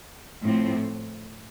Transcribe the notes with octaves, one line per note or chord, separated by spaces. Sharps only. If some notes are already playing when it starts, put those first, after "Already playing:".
A2 F3 A3 C4